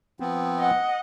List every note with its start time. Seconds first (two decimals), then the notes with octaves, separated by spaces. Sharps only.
0.20 F3 B3 C4
0.59 D#5 F#5